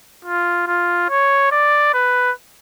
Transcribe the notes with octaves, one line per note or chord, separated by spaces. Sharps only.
F4
F4
C#5
D5
B4